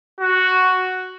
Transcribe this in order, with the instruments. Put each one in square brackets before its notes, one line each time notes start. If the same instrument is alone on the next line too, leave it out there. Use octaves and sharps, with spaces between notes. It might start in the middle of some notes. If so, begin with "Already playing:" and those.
[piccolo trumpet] F#4